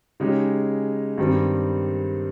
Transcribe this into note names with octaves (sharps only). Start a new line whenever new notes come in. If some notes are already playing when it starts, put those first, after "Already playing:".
C#3 G#3 D#4 G4
G2 D#3 G3 C4